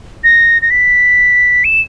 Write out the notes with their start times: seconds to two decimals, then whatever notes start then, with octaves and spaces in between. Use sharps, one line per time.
0.24 A#6
0.62 A#6
0.70 B6
1.64 E7